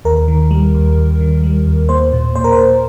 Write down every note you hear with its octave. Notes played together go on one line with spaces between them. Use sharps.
D#2 A#4
D#3
G3
D#2
D#2
D#3
G3
D#2
A#3 C5
A#2
A#2 C5
A#4
C5
A#2